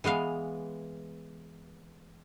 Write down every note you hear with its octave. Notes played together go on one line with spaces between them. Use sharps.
E3 G#3 B3 F5